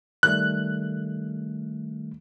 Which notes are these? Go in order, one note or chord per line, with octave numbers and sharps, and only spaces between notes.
D#3 G3 A3 F#6